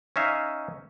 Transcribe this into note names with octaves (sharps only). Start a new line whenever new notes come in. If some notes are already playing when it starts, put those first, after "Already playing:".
C#4 D#4 E5 F5